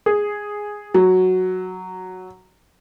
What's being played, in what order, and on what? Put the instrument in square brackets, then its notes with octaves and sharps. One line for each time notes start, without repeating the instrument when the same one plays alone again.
[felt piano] G#4
F#3